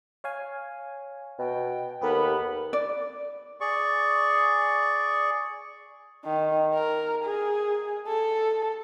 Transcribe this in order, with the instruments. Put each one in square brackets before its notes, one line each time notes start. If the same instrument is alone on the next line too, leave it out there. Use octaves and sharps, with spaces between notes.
[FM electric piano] C#5 F5 G#5
[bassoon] B2 [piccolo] G5
[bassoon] D#2 [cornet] B3 [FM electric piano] G4 A4 A#4 [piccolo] B5
[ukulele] D5
[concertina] G#4 D5 C#6
[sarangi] D#3
A#4
G#4
A4